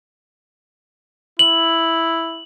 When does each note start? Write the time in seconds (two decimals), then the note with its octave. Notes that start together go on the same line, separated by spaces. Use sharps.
1.39 E4 F#7